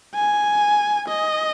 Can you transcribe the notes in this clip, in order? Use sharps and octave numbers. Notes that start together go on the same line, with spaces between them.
G#5
D#5